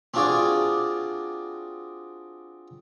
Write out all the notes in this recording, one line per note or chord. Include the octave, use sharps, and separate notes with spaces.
C4 D4 F4 F#4 G#4 D5